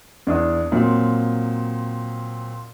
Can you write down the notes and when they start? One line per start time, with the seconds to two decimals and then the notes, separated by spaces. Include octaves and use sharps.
0.27 E2 D4 D#6
0.72 A#2 F#3 C4